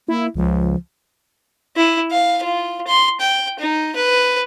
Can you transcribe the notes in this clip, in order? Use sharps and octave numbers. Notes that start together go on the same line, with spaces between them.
A#3 E4
C#2 F3
E4
F5
F4
C6
G5
D#4
B4